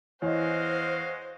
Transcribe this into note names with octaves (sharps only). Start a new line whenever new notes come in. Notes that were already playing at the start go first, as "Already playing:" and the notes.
E2 G#3 F#4 C5 C#5 D#5 F5